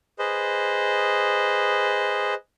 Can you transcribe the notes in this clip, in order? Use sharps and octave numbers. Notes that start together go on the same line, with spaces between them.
G#4 B4 C5 D#5